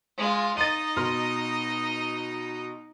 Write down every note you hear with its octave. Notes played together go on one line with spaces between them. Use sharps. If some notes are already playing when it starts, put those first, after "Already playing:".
G#3 F4
D#4 D#5 A6 D#7
B2 C6 F6